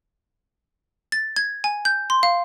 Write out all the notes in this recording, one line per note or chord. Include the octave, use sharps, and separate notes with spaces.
A6
G#6
G#5
G6
C6
F5